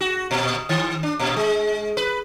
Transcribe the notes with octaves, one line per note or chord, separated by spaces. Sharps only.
F#4
A#2
D#3
D4
A#2
G#3
B4